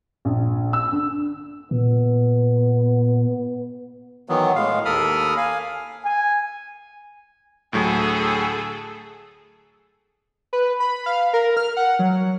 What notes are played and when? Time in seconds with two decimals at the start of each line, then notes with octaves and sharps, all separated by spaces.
0.25 A#1
0.73 E6
0.92 D3
1.71 A#2 B3
4.29 D#3 E3 F#3 B3
4.56 A2 G#3 F5
4.85 D#2 A4 A#4 B5 D#6 F6
5.37 F5 G#5
6.05 G#5
7.73 D2 A2 F#3 G#4 A4
10.53 B4
10.80 B5
11.06 F5
11.33 A#4
11.57 F6
11.77 F#5
11.99 F#3